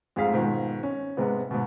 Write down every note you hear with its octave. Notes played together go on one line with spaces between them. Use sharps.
F2 G#2 A3 G#4 F5 B6
G#2 B2 D#3 F3
C#4
G#2 C3 G#3 B3
G#2 B2